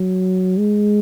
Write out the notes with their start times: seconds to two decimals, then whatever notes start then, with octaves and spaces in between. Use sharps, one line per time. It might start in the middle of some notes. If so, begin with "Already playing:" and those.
Already playing: F#3
0.59 G#3